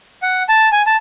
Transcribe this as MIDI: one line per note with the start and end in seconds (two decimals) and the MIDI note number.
0.22 0.43 78
0.49 0.69 81
0.72 0.82 80
0.86 0.96 81